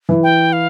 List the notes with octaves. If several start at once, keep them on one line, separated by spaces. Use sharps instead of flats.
E3
G5
F5